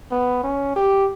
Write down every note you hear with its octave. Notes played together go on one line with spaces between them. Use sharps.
B3
C#4
G4